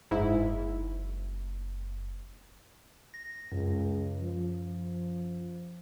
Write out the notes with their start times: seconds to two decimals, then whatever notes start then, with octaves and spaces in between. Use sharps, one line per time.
0.11 F#1 G#2 E4
3.14 A#6
3.52 C#2 F#2
4.20 F3